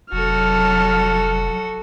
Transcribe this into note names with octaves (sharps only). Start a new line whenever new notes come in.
F1 F#3 F#4 A4 A5 F6